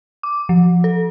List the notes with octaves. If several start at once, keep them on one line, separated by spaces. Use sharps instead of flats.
D6
F3
A4